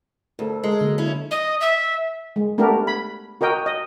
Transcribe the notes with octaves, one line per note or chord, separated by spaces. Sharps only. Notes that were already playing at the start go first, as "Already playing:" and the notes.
D2 A4 A#4
G#3 A4 A#4
D3 F#3 A#3
C#4 E4
D#5
E5
G#3
A3 B3 D4 G4 A#4
B5
F#4 A#4 D#5 G5
D#5